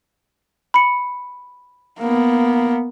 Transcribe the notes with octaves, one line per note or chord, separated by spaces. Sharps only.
B5 C#7
A#3 B3